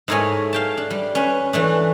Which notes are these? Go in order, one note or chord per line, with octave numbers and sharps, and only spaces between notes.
G#2 A3 E4 A#4 C#5 G#5
F5 G5 A5
D4
G3
C#4 B4
E3 A3 D4